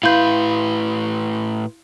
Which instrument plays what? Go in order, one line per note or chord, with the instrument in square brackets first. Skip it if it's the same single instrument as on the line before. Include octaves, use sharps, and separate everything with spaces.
[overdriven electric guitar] A2 B4 [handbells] E4 C6 [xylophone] F5 G6